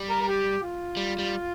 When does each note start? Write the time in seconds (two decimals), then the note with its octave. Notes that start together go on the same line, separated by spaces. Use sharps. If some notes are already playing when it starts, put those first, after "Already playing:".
Already playing: G3
0.10 A#4
0.21 A#4
0.27 G4
0.62 F4
0.97 G3
1.19 G3